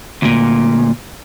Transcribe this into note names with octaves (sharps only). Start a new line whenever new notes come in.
D2 A#2